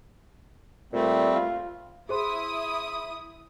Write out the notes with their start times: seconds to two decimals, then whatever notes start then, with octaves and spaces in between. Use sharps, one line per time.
0.93 A#2 G3 A3 C4
1.35 F4
2.09 E4 G#4 C5 C6 D#6